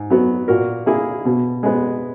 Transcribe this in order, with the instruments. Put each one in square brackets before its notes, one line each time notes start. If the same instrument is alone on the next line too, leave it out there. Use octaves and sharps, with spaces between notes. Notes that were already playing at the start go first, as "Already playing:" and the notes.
Already playing: [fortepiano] G#2
F#3 B3
A#2 F#4 A#4
A#3 E4 G#4
B2
G#3 B3